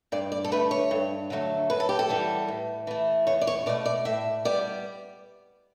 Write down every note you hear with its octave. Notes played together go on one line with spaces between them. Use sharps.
G2 D5
D5
A4
D3 A3 B4
C#5
G2
D3 F#3 A3
F#2 B4
A4
G4
A4
E3 G3 B3
A2
E3 A3
E2 C#5
D5
C#5
B2 A3 D5
D5
A2 E5
G3 B3 D5